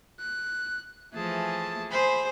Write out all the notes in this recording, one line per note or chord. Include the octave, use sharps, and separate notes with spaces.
F#6
E3 F3 A3 G#4 A5
G#4 C5 B5